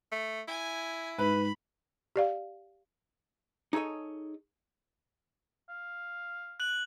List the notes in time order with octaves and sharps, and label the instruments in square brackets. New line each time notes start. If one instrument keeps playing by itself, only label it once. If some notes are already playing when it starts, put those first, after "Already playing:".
[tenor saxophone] A3
[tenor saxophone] E4 [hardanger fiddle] G#5
[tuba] G#2 [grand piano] B4 [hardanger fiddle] B5
[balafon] G4 D5 F5
[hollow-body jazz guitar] D#4 G#4 A4 C#5 D#5
[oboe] F5
[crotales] F#6 F#7